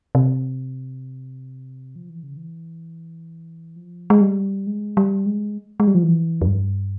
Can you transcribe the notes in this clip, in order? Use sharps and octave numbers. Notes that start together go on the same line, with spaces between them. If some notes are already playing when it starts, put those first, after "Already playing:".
C3
F3
E3
C#3
E3
F3
G#3
G3
G#3
G3
G#3
G#3
G3
F3
E3
F2
G2